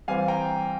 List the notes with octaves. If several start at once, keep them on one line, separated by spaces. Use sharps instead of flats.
E3 G3 C4 F5 G#5
G5 A#5